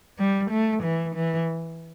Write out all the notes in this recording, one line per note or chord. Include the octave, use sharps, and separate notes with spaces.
G3
A3
E3
E3